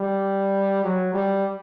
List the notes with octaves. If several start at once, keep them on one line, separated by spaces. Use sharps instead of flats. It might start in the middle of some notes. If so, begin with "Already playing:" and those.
Already playing: G3
F#3
G3